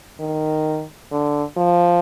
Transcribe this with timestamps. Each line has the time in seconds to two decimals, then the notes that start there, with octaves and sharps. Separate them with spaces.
0.20 D#3
1.11 D3
1.57 F3